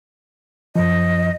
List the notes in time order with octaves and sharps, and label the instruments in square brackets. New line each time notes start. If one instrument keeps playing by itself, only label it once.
[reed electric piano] F#2 F3 [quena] D#5